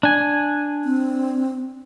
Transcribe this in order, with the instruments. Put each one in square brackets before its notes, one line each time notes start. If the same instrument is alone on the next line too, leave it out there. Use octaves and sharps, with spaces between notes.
[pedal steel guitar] D4 G#5
[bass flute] C4